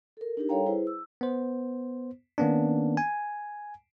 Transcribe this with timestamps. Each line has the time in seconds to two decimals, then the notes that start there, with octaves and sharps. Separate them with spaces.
0.17 A4 A#4
0.37 D4 D#4 G4 A#4
0.49 G3 A4 C#5 F5 G5 A#5
0.66 E4 G#4 B4 C5
0.87 E6
1.21 B3 C5
2.38 D#3 A#3 B3 C#4 D4
2.97 G#5